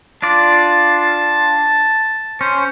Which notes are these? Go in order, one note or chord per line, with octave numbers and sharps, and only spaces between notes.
D4 F4 D5 A5
C#4 C5